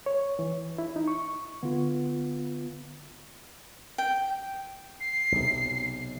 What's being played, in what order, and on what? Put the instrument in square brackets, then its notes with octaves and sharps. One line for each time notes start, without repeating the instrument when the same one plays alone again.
[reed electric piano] C#5
E3
E4
D#4
C#6
[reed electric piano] D3 [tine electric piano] B3 F4
[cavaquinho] G5
[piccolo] C7
[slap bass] B1 C3